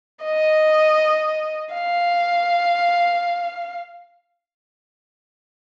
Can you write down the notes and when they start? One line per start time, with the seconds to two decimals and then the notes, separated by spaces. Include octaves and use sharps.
0.24 D#5
1.74 F5